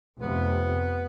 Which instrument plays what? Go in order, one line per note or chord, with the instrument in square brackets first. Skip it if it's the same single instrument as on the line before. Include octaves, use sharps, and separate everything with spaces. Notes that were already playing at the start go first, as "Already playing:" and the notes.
[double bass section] F1 F2 C3 [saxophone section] B3